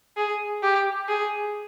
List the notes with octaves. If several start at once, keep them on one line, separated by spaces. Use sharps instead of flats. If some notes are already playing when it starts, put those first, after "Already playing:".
G#4
G4
G#4